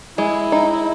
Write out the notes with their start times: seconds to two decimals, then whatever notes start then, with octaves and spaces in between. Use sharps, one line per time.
0.18 G#3 E4
0.52 D#4